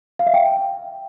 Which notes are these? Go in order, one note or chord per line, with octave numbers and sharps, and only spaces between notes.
F5
E5
G5